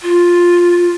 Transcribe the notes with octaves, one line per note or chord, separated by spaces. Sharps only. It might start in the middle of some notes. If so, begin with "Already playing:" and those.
F4